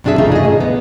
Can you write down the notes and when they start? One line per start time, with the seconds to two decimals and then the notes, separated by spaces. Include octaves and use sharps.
0.04 F#2 C3 D4 F4 G#4 E5
0.18 C#3 E3 A3 D#4 F4
0.32 G#4 D#5
0.45 A#2
0.60 B3